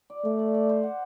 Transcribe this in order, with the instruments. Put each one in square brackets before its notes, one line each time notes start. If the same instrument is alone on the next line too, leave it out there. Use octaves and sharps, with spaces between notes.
[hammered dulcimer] D5
[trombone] A3 [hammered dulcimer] D5
[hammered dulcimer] D5
D5
C5
F#5